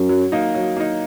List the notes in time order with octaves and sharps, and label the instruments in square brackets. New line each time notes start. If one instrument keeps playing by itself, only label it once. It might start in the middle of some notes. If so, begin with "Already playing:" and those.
Already playing: [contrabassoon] F#2
[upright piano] F#3
A#3 D#4
F#3
A#3 D#4